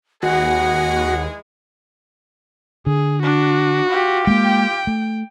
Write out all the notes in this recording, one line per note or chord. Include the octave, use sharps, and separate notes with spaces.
D#2 E3 G#3 F#4 G#4 F#5
D3 G#4
D4 F#4
F4 G4
G#3 A#3 G5
A3